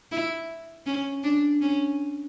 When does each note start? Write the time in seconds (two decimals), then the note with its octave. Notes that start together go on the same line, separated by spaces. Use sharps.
0.12 E4
0.86 C#4
1.24 D4
1.61 C#4